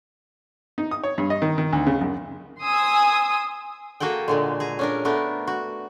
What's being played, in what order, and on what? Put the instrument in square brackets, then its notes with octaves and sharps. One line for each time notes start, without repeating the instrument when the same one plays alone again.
[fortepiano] D#4
D#6
C#5
G2
D#5
D#3
D#3
D2
C#3
F#2
[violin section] G#5 C6 D#6 E6
[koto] A#3 F#4 G#4 A4 G5
A#2 D3 G#3
G#4 A#5
C#4 D4 A#4
A3 B3 D4 A#4
F#4